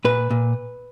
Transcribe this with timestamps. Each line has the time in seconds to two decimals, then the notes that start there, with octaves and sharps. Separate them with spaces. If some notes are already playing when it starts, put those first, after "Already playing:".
0.05 A#2 B4
0.30 A#2